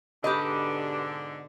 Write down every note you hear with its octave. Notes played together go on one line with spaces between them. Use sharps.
G#2 B2 D3 D4 G4 B4 D#5